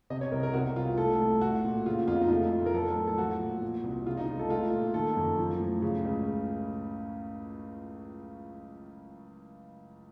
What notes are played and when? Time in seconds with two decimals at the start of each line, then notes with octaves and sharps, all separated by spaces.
0.10 C3 D#5
0.21 C#5
0.32 C2 A#4
0.43 A#4
0.53 C3 F#4
0.76 C2 F4
0.98 A3 A4
1.21 A2
1.41 A3 F#4
1.65 A#2
1.86 C#3 F4
2.08 F2 F4
2.21 D#4
2.31 A3 F4
2.52 A2
2.66 A#4
2.74 F#3 A4
2.96 A2
3.07 A4
3.18 F3 F#4
3.41 A#2
3.62 A#2
3.84 C2
4.06 C#3 F4
4.17 D#4
4.28 C#2 F4
4.39 A4
4.50 A3 F4
4.73 A#2
4.94 D#3 A4
5.17 F#2
5.39 F3
5.60 A2
5.82 C#3
6.05 C#2